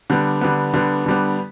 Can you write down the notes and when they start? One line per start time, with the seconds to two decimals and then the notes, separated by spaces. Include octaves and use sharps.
0.10 D3 G3 B3
0.41 D3 G3 B3
0.74 D3 G3 B3
1.06 D3 G3 B3